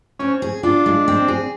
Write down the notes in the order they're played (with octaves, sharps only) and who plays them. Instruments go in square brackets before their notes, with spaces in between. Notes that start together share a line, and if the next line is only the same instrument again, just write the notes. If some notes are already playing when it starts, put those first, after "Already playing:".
[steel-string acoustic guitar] C4 [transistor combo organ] C#4
[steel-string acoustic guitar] G#4
[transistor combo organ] D4 [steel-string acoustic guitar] F4
[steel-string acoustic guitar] G#3
C4
G#4